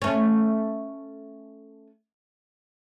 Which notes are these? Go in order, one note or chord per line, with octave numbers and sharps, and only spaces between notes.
A3 C#4